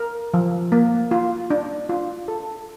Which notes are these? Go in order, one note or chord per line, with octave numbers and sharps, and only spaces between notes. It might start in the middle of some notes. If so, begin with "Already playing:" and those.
Already playing: A#4
F3
A#3
F4
D4
F4
A4